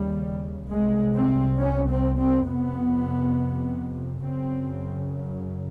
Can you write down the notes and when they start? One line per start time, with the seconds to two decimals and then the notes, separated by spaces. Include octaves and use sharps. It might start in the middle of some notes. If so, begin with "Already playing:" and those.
Already playing: D#2 C#3 G3
0.70 C2 C3 G#3
1.15 C4
1.59 C#4
1.89 C4
2.18 C4
2.47 F2 C3 B3
4.24 F#2 C#3 C4